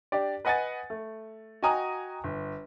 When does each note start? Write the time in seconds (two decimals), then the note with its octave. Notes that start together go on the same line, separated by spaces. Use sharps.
0.12 D4 G4 D5
0.45 B4 D#5 F#5 G#5 D#6 A6
0.90 A3
1.62 F#4 D#5 G5 G#5 A#5 D#6
2.24 G1